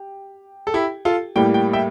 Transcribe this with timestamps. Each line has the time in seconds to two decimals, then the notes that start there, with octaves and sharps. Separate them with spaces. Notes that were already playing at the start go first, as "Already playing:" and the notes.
Already playing: G4
0.67 A4
0.74 E4 G4
1.05 F4 A4
1.36 A2 G3 A#3 G5
1.54 G5
1.73 E5 G5